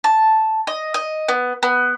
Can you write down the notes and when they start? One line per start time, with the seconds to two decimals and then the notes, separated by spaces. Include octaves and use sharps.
0.04 A5
0.67 D#5
0.94 D#5
1.28 B3
1.63 B3